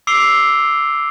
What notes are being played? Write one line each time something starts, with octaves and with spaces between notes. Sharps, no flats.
D6 E6 C7 D7 F7 G7